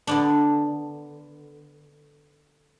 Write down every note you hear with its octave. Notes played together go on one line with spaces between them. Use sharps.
D3 B3 D4